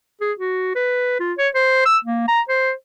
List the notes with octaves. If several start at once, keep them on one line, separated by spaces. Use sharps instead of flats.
G#4
F#4
B4
F4
C#5
C5
E6
A#3
A#5
C5